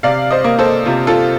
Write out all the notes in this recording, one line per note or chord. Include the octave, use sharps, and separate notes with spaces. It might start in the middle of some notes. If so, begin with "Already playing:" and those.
C3 D5 F5
C5 D#5
A#3
A4 C5
C3 F4
F4 A4